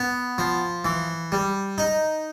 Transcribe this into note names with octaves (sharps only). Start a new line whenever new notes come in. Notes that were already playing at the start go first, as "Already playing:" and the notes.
Already playing: B3
F3
E3
G3
D#4